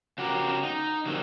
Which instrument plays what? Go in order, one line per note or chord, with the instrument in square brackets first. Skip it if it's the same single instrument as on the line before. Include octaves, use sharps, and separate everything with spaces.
[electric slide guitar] C#3 F#4 G4 A#4
D#4
D3 F#3 G3 A#3 C4